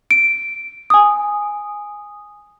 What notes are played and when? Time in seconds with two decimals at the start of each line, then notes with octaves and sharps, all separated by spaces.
0.11 D7
0.90 G#5 D#6